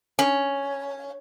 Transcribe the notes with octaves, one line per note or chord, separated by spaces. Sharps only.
C#4